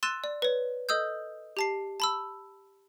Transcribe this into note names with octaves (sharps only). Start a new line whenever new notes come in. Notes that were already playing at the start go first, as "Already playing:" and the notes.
C6 E6 F#6 A6 D#7 E7
D5
B4 C#5
A4 D#5 D#6 E6 G6
G4 A5 C7
A5 B5 E6